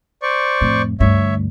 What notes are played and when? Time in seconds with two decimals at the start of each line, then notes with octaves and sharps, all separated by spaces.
0.22 C5 D5 C#6
0.61 F2 A2
1.00 D2 G2 C#5 E5